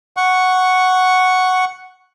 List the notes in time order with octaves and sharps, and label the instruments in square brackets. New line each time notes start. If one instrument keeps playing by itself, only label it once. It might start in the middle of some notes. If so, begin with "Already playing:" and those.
[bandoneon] F#5 C#6